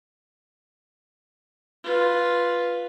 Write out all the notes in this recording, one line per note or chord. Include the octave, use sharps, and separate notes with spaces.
F4 B4